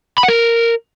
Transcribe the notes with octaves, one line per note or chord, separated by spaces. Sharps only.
B5
F#5
A#4